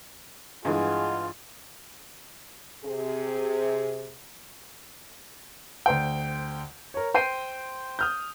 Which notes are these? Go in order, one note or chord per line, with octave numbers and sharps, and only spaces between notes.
G2 E3 G#3 F4 G#4 D#5 F#5
C3 G#4
D2 C5 G5
A#4 C#5
C5 G5 C6 C7 D#7
D#6 F6 G6